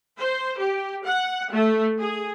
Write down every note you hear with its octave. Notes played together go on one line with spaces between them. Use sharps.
C5
G4
F#5
A3
G#4